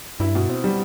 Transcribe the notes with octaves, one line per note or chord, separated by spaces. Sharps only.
G2 E4
B2
C4
G3